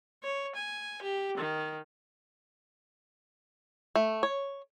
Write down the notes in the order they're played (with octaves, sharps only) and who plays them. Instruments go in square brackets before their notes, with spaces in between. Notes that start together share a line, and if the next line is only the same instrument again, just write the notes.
[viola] C#5
G#5
G4
D#3
[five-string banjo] A3
C#5